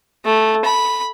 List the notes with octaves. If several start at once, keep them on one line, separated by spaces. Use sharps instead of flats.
A3
B5